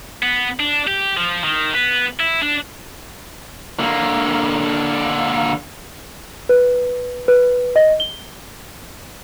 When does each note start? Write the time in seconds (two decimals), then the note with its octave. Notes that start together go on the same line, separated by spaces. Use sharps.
0.23 B3
0.60 D4
0.87 G4
1.17 F3
1.44 D#3
1.74 B3
2.20 E4
2.42 D4
3.80 D3 A#3
6.49 B4
7.28 B4
7.76 D#5
8.00 G7